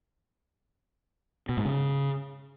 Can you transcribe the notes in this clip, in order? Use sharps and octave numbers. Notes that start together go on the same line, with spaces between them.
B2
G#2
C#3